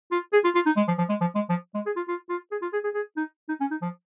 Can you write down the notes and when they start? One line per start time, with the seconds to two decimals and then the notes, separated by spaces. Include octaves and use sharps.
0.12 F4
0.33 G#4
0.44 F4
0.55 F4
0.66 D#4
0.77 G#3
0.88 F3
0.98 F3
1.09 G#3
1.21 F3
1.35 G#3
1.50 F3
1.75 G#3
1.86 G#4
1.96 F4
2.08 F4
2.29 F4
2.51 G#4
2.62 F4
2.73 G#4
2.84 G#4
2.94 G#4
3.17 D#4
3.49 D#4
3.60 C#4
3.71 D#4
3.82 F3